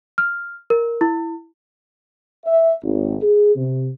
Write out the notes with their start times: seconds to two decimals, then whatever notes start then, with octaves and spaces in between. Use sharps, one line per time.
0.18 F6
0.70 A#4
1.01 E4
2.45 E5
2.83 G#1
3.22 G#4
3.56 C3